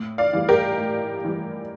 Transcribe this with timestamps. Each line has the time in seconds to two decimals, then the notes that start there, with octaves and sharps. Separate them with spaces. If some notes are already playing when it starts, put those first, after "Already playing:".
Already playing: A2
0.18 D5 F5
0.33 E3 G3
0.49 G4 A#4
0.79 A2
1.24 E3 G3